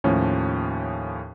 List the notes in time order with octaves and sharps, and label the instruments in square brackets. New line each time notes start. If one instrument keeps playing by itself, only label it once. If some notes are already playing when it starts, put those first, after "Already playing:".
[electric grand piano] D#2 A2 F3 C#4